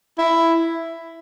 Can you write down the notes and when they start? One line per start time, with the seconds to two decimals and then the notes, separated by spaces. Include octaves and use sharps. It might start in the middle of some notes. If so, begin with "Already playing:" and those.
0.18 E4